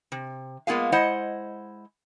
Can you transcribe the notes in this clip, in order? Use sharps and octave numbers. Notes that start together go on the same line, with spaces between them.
C3
G#3 A#3 B3 F4 G#4 F5
G#3 E4 C5 D#5 F#5